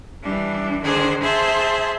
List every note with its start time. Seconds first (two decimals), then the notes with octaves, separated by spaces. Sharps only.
0.22 E3 G3 D4
0.82 D3 D#3 D4 G#4 C5
1.21 G#4 C5 E5 A5